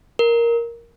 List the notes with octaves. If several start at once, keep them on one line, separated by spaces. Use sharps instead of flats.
A#4